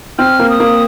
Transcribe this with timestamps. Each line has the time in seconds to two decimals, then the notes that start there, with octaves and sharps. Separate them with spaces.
0.18 C4 F6
0.39 A#3
0.49 D#6
0.60 A#3